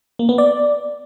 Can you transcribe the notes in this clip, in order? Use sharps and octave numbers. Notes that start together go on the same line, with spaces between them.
A#3
B3
D5